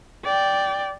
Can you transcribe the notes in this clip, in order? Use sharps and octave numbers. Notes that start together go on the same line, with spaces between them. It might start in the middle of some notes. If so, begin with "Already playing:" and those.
D5 G5